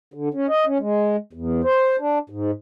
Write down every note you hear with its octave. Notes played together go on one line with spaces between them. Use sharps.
D3
C#4
D#5
C#4
G#3
E2
C5
D4
G#2